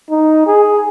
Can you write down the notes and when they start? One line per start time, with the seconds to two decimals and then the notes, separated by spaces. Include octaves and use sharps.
0.10 D#4
0.47 G#4